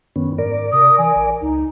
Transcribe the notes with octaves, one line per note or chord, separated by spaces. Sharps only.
F#2 D#3 B3 C#4
G#2 A#4 D5
C3 D#6
E3 G#5
A1
C#2 D#4